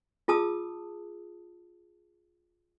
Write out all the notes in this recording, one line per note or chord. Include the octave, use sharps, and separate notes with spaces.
F4 G#4 A5 D#6 E6